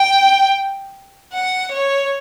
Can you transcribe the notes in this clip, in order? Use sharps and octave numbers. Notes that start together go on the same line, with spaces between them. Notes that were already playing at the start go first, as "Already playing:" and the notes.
Already playing: G5
F#5
C#5